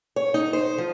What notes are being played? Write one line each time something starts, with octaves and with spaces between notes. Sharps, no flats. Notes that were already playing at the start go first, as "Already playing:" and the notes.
C#5
D#4
C5
F3